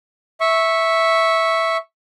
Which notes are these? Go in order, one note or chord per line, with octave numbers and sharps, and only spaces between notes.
E5 C#6